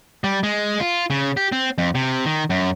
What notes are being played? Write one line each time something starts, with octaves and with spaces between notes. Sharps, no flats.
G3
G#3
F4
C#3
G4
C4
F2
C3
D#3
F#2